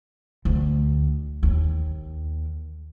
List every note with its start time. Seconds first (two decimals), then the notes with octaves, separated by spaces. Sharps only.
0.45 D2
1.43 D#2